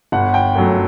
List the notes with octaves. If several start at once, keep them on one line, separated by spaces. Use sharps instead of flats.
G1 F#5
G5
F#2 F#3 A3